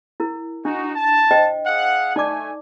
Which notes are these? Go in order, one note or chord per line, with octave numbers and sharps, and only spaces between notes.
E4 A#4
D4 D#4 F#4
A5
C5 D#5 G5
G#4 F5 F#5
A3 D#4 D5 G#5 D6